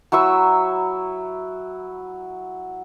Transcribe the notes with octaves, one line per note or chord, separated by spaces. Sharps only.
F#3 E4 C#6 E6